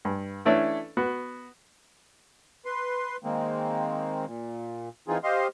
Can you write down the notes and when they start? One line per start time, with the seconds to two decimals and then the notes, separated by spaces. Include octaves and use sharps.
0.05 G2
0.45 E3 A3 C#4 D4 E4 A4
0.97 B3 F#4
2.65 B4 C6
3.24 D#3 G#3 A#3 C4
4.26 A#2
5.08 E3 C4 D#4 F4 G#4
5.23 G4 C5 D#5 F5 C6